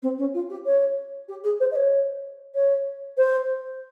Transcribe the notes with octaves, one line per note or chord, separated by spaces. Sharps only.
C4
C#4
F4
G4
C#5
G4
G#4
C5
D#5
C#5
C#5
C5